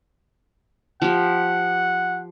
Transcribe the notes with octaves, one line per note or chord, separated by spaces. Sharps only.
F3 G4 F#5